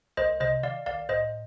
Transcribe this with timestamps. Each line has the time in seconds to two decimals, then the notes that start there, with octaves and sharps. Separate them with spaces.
0.17 C2 C5 D#5
0.40 C3 C5 D#5
0.63 D#3 D5 F5
0.86 C2 D5 F5
1.09 A2 C5 D#5